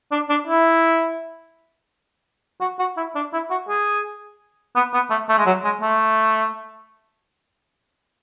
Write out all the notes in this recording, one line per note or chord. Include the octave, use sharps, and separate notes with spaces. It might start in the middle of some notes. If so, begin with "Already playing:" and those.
D4
D4
E4
F#4
F#4
E4
D4
E4
F#4
G#4
B3
B3
A3
A3
G#3
F#3
G#3
A3